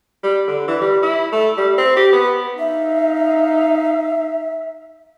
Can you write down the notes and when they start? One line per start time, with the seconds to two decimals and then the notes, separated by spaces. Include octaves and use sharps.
0.23 G3
0.47 D3
0.68 E3
0.81 G3
1.02 E4
1.32 A3
1.57 G3
1.78 C4
1.97 G4
2.13 B3
2.59 D#4 E5 F5